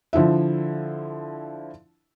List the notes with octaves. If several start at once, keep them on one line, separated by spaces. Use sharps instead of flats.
D3 F3 E4 E5